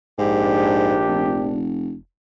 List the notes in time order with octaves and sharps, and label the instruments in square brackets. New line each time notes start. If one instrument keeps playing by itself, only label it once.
[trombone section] A#1 D4 G4 [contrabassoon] G#2
[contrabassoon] F1